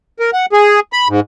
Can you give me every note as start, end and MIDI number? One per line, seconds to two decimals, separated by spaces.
0.20 0.30 70
0.33 0.46 78
0.53 0.80 68
0.93 1.08 83
1.09 1.20 44